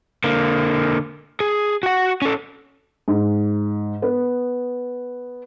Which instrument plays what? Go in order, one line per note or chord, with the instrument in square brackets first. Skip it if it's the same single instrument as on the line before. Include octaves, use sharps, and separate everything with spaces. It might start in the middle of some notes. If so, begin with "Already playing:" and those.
[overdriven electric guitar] D3 A#3
G#4
F#4 F#5
C#4 A4
[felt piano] G#2
B3